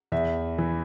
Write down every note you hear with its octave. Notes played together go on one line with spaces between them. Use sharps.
E2 E5
E3